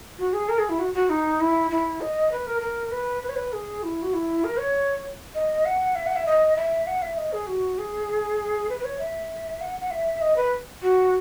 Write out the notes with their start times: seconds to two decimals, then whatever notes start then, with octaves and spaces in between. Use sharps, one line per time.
0.19 F#4
0.33 G#4
0.49 A#4
0.59 G#4
0.69 E4
0.79 F#4
0.94 F#4
1.10 D#4
1.40 E4
1.71 E4
2.01 D#5
2.31 B4
2.47 A#4
2.61 A#4
2.91 B4
3.22 B4
3.29 C#5
3.36 B4
3.53 G#4
3.83 E4
4.02 F#4
4.13 E4
4.44 A#4
4.59 C#5
5.35 D#5
5.65 F#5
5.96 E5
6.06 F#5
6.16 E5
6.26 D#5
6.56 E5
6.87 F#5
7.02 E5
7.17 D#5
7.32 G#4
7.47 F#4
7.78 G#4
8.69 B4
8.79 B4
8.85 C#5
8.99 E5
9.61 F#5
9.80 F#5
9.91 E5
10.21 D#5
10.36 B4
10.82 F#4